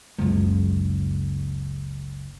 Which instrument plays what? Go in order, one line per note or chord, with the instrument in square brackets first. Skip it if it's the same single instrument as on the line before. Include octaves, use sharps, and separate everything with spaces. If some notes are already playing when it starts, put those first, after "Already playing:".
[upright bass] F#1 C#2